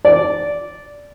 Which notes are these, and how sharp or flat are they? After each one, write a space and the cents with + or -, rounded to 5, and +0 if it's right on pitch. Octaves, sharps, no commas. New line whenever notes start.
D5 -10